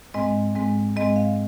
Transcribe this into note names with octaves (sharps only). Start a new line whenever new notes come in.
G#2 G#3 C4 D#5
G#2 G#3 C4
G#2 G#3 C4 D#5
F5